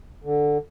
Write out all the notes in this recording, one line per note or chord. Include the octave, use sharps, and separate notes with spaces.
D3